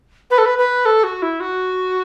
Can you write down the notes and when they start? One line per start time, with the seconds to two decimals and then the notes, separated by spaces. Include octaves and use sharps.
0.31 B4
0.38 A4
0.45 B4
0.58 B4
0.85 A4
1.03 F#4
1.22 E4
1.40 F#4